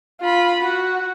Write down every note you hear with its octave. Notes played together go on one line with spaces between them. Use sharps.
F4 B5
F#4